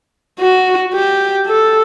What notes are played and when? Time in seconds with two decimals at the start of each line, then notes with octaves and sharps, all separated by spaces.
0.40 F#4
0.94 G4
1.47 A4